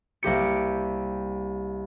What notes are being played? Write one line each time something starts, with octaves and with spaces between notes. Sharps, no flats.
C2 A#3 G4 C#7